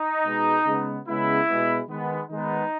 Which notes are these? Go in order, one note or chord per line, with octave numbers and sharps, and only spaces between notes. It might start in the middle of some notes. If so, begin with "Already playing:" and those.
Already playing: D#4
B2 G#3 B3
C#3 G#3 B3
C#3 G#3 B3 E4
B2 G#3 B3
D#3 G#3 B3
D#3 G#3 B3 D#4